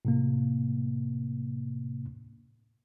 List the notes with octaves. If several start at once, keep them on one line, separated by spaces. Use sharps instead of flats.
A2 C3 A#3